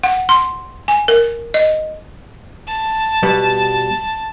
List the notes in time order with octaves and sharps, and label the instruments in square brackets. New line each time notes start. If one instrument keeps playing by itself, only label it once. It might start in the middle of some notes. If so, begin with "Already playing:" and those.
[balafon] F#5
C6
G#5
A#4
D#5
[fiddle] A5
[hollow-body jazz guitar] B2 G3 B3